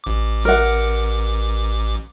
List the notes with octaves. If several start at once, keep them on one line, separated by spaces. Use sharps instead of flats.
A1 D6
A#4 F#5